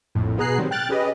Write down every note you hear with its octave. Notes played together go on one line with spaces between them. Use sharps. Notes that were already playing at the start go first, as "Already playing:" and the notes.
A#1 F2 A2
B2 B3 G#4 A#5 F#6 C7
D#3 F#3 G3 C4
G5 F6 F#6 A6
C#4 G4 G#4 B4 D#5